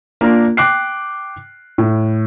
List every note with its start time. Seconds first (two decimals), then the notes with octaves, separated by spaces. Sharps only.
0.21 A#3 D4 F4 A#4
0.57 G5 D6 F#6 C7
1.78 A2